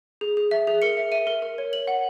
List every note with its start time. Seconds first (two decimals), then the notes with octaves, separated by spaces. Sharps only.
0.21 G#4
0.37 G#4
0.51 E5
0.67 G#4
0.82 A#4 C#7
0.97 E5
1.12 E5 D#7
1.27 A#4
1.42 A#4
1.58 C#5
1.73 C#5 F#7
1.88 F#5